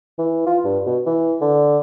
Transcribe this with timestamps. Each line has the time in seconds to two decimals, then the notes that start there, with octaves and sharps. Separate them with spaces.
0.19 E3
0.47 F4
0.65 G2
0.86 B2
1.06 E3
1.41 D3